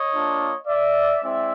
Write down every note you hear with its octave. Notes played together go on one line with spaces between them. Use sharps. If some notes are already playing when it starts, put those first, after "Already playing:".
Already playing: C#5 D#5
A#3 D4 F4
D5 E5
G#3 C4 E4 D5 E5